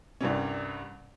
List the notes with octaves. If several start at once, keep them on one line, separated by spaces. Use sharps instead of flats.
C2 G2 C3 C#4